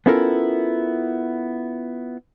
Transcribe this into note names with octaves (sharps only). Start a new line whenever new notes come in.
B3 C#4 E4 F4 A4 A#4